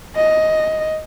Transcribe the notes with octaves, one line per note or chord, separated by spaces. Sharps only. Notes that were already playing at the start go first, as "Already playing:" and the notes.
D#5